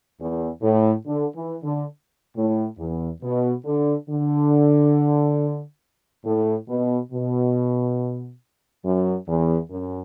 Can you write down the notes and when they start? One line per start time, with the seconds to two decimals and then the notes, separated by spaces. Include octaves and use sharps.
0.19 E2
0.62 A2
1.06 D3
1.34 E3
1.63 D3
2.36 A2
2.79 E2
3.22 B2
3.64 D3
4.09 D3
6.24 A2
6.68 B2
7.12 B2
8.84 F#2
9.27 E2
9.70 F#2